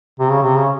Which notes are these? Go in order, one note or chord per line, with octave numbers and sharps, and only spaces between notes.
C3
C#3
C3
C#3